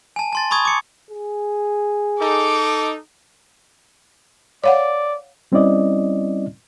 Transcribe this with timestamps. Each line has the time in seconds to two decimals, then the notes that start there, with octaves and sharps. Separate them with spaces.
0.16 G#5 A5
0.33 A5 C6 A6
0.51 B5 C#6 D#6 G#6
0.65 D6 C#7
1.11 G#4
2.21 D#4 A4 D6
4.64 C#5 D5 F5 F#5
5.52 G3 C4 C#4 E4 D5 D#5